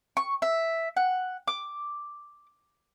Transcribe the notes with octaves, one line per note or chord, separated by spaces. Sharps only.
C#6
E5
F#5
D6